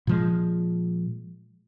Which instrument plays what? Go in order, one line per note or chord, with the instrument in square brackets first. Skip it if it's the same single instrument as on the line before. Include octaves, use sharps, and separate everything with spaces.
[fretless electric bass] A#2 F3 G#3